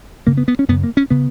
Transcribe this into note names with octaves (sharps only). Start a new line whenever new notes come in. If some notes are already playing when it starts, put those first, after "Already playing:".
F#2 C#3 A#3
B3
B3
C#4
F#2 C#3 B3
A#3
C#4
C#3 B3